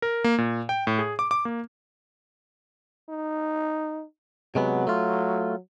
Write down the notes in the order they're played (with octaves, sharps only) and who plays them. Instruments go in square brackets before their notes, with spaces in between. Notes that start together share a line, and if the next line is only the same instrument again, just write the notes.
[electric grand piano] A#4
A#3
A#2
G5
A2
G#4
D6
D6
A#3
[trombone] D#4
[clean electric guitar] C3 G#3 B3 [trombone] F#3
[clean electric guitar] A3 F4